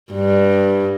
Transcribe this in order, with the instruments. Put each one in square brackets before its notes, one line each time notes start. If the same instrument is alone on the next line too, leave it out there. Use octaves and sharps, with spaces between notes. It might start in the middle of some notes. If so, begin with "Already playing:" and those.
[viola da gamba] G2